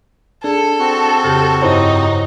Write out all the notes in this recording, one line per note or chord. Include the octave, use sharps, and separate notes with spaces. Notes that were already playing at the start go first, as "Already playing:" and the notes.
D4 G#4 A4
C4 F#4
F2 C#3 G4
G2 D#4 E4 C5 C#5